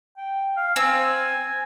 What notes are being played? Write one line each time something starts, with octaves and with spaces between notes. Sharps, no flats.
G5
F5
C4 G#5 E6